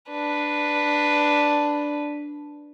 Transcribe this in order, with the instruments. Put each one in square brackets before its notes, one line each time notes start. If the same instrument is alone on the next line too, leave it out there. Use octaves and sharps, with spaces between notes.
[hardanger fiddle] D4 B4